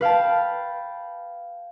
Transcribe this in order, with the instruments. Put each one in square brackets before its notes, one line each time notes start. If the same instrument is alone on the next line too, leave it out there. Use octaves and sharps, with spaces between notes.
[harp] B4 F5 G5 A5